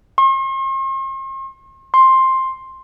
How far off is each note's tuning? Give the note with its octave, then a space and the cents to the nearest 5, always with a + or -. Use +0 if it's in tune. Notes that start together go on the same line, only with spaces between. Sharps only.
C6 +45
C6 +10